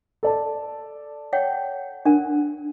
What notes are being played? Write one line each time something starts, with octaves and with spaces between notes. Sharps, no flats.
A4 D5 A5
C#5 F#5 G5
D4 A#4 F#5